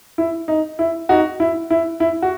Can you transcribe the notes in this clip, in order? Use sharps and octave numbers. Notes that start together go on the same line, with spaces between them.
E4
D#4
E4
D#4 F#4
E4
E4
E4
F#4